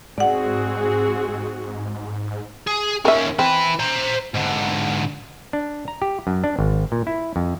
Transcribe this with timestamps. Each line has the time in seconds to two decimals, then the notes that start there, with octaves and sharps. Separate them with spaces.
0.18 G#2 C4 F#4 G#4 D5 F#5
2.67 G#4
3.05 D#2 C#4 A#4 E5
3.39 C4 E4 B4
3.80 C5 A#5
4.35 G#2 D3
5.53 D4
5.88 A#5
6.02 G4
6.27 F#2
6.44 D4
6.59 G#1
6.92 A#2
7.07 E4
7.36 F2